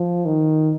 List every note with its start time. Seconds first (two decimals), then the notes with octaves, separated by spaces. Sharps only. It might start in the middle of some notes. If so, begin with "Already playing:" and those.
Already playing: F3
0.26 D#3